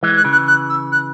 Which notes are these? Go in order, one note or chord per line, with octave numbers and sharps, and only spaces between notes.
E3 G#3
F#6
C#3 E3
F#6
F#6
E6
F#6